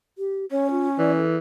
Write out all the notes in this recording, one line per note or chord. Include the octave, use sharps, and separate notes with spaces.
G4
C#4 C#5
F4
E3 D5
A4